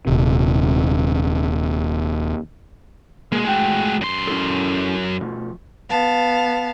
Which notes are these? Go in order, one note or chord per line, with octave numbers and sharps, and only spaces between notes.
D#1 C3
B2 G#3 A#3
A2 G#3 F#4 G5
F#2 C6
C#4 E4 A4
B2 F3 A3
B3 F5 A5